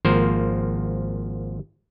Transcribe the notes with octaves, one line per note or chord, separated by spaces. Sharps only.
G#1 F3 A#3 C5